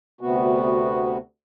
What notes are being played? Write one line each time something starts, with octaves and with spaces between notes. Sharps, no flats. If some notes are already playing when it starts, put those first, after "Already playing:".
D2 C3 B3 F#4